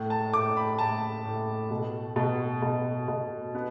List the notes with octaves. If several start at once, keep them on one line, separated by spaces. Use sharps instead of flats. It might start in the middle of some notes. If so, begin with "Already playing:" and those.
Already playing: A2
A5
A2 D6
B5
A2 A5
A2
B2
B2
B2
B2
B3